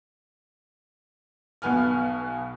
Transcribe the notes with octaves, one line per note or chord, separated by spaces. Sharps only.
B1 B2 B3 G#5 F6